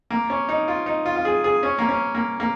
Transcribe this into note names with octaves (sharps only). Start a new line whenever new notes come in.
A#3
C#4
D#4
F4
D#4
F4
F4
G#4
G#4
C#4
A#3
C#4
A#3
A#3